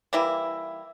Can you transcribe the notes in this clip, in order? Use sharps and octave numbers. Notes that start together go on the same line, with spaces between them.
E3 G3 A#3 E4